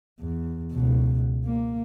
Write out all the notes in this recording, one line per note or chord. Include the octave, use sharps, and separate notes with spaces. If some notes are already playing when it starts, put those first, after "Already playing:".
E2
C#2 B2
A#3